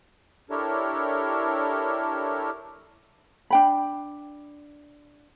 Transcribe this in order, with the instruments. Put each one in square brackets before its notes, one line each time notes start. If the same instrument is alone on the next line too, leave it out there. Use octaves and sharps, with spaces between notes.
[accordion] D4 E4 G4 A4 A#4 C#5
[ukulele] D4 G5 B5